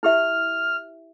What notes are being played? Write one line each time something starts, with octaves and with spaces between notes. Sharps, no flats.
E4 G4 E5 F6